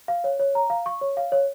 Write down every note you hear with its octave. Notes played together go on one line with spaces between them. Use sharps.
F5
C#5
C#5
A#5
F5
C#6
C#5
F5
C#5